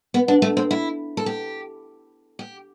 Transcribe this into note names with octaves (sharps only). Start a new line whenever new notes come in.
B3
D4
A3
C4
E4
A4
G4
G4